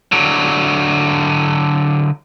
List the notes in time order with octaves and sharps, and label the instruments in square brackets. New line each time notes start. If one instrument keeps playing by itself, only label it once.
[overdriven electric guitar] D3 F#3